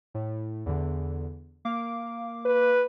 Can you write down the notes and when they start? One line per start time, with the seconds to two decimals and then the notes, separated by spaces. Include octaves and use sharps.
0.15 A2
0.66 E2 D3
1.65 A#3 F5 D6
2.45 B4